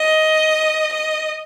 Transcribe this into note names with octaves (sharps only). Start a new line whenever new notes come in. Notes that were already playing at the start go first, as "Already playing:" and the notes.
Already playing: D#5
D#5